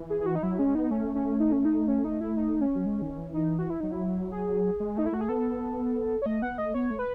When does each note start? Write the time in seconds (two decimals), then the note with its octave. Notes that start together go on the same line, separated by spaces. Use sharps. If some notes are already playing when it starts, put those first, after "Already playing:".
Already playing: E3
0.10 G#4
0.21 G#4
0.26 F#4
0.35 D#4
0.43 F#3 E4
0.59 G#3 C#4
0.75 B3 D#4
0.91 A3 C#4
1.15 C#4
1.40 D#4
1.52 C#4
1.65 D#4
1.88 C#4
2.04 D#4
2.21 E4
2.37 D#4
2.61 C#4
2.75 F#3
2.86 G#3
3.02 D#3
3.18 E3
3.34 D#4
3.59 F#4
3.70 E4
3.80 F#3 D#4
3.92 E4
4.32 G#4
4.80 G#3
4.97 A3 D#4
5.06 E4
5.12 A3 F#4
5.21 G#4
5.29 B3 A4
6.22 C#5
6.26 A3 D#5
6.42 B3 F#5
6.58 A3 D#5
6.74 B3 C#5
6.91 A3
6.99 B4